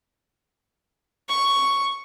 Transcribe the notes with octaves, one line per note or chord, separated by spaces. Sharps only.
C#6